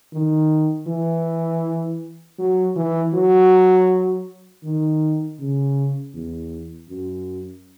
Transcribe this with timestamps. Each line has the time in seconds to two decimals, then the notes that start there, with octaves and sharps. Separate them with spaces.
0.13 D#3
0.87 E3
2.39 F#3
2.76 E3
3.14 F#3
4.64 D#3
5.40 C#3
6.14 E2
6.89 F#2